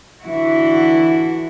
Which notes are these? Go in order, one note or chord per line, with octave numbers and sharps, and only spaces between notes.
D3 E3 E4 F#4